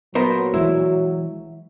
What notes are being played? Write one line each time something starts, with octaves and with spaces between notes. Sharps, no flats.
A#2 F#3 B3 A#4 C5
E3 G#3 E4